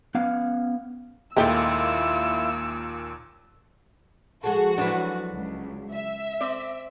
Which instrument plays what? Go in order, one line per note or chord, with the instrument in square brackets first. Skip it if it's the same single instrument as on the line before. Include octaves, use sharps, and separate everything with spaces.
[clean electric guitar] B3 C#4 F5 F#5
[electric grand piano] D#2 A#2 [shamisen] G#3 A3 G4 [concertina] E4 F4 [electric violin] E6
[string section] F3 F#4 [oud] G#3 G#4 A4
[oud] F#3 G#3 E4 [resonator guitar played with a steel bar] D4 B4
[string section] C#2
E5
[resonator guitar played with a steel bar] C4 D5